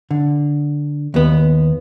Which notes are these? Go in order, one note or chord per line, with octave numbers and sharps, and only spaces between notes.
D3
D#2 B3